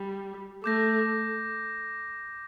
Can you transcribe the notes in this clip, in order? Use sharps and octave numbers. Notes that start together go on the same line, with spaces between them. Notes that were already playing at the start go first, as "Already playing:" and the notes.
Already playing: G3
A3 D6 G6 A#6